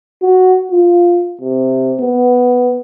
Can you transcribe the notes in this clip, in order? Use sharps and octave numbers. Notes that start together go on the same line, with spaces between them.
F#4
F4
C3
B3